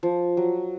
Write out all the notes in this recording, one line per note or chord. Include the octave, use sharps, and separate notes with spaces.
F3
F#3